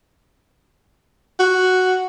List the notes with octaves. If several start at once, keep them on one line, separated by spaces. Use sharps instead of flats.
F#4